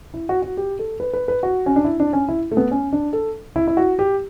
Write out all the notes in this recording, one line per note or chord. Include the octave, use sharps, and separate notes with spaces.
E4
F#4
F#4
G4
A4
B4
B4
B4
F#4
C#4
D4
E4
D4
C#4
E4
A3
B3
C#4
D4
A4
E4
E4
F#4
G4